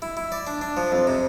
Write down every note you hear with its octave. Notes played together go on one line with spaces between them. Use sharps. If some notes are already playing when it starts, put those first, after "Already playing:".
E4
E4
D5
D4
D4
F3
F2
C3